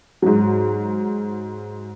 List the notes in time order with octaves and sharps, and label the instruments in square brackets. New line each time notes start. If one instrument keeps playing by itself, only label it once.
[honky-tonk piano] G#2 F#3